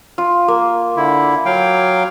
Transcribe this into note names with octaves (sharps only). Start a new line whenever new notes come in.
F4
A#3
D3 E4
F#3 F5 G5